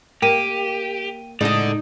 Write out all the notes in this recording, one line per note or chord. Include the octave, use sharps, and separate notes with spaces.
A#3 G4 G5 D#7
A2 C#3 G#3 D#4 A4 D5 D#5